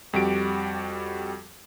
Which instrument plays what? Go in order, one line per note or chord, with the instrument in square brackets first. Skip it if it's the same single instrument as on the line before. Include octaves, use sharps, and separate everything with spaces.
[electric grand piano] F2 G3 F#4 G4 D7